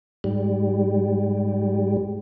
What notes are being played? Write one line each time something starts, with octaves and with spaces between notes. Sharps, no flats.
G#2 G3